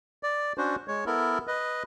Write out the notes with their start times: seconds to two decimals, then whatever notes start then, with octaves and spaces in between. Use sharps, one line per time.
0.23 D5
0.58 C#4 D4 F#4 C5
0.88 G#3 C#5
1.06 B3 E4 A4 A#4
1.47 B4 D#5